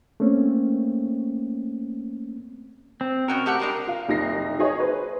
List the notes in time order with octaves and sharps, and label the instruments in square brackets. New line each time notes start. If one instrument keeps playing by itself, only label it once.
[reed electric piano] A3 A#3 C4 C#4
[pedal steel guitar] C4
[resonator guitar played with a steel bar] B2 C#4 F#4 [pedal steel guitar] A#4
[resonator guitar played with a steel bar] A3 G4 F#5
G3 G#3 D4
[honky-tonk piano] F4 F5
F#1 C2 D#4 F4 A#6 C7
D#4 G#4 C#5 D#5
B4 C5